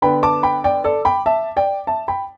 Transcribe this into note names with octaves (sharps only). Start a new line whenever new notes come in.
D3 B3 G5 B5
A5 D6
G5 B5
D5 G5
A4 D5
G5 B5
E5 A5
D5 G5
E5 A5
G5 B5